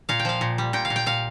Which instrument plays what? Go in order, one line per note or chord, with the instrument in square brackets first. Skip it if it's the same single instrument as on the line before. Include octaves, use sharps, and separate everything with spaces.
[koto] A#2 F5
G5
F3 F5
A#2
G3
A#2 G5
F5
A#2
G5
A#2 F5